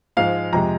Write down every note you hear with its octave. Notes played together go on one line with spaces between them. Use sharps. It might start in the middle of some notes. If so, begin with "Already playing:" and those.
G#2 F3 G#3 F5
F2 C3 G#3 A#5